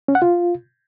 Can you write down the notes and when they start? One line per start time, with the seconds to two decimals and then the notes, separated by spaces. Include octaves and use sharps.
0.08 C#4
0.15 F#5
0.22 F4